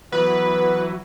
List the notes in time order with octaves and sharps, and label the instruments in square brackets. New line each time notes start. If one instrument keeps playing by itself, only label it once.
[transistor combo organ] E3 F#3 [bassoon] B3 [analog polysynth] B4